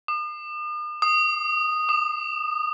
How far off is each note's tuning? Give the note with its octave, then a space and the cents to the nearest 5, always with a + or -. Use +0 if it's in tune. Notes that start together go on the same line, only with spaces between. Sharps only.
D#6 -45
D#6 -10
D#6 -45